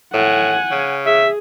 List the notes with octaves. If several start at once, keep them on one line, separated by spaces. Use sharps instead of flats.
A2 F#5 G#5
C#3
G#4 E5